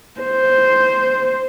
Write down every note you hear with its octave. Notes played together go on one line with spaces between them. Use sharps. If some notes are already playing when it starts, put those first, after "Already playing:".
C5